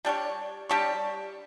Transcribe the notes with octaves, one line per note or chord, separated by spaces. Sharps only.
G3 D4 G4 C#5
G3 D4 G4 C#5